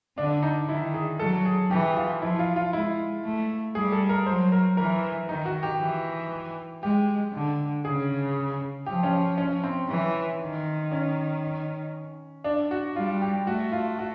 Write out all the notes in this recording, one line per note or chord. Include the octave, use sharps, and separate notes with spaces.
D3 D4
D#4
D#3 E4
G#4
F#3 A4
G#4
E3 G4
F4
F3 E4
F4
F4
G#3 E4
A3
G3 G#4
A4
A#4
F#3 C5
A#4
E3 A#4
D#3 D#4
F#4
G4
E3
G#3 G4
D3
C#3 G#4
F3 G4
C#4
C#4
C4
E3
D#3
C#4
D4
F#4
G3 F4
G4
A3 F#4
F4
F#4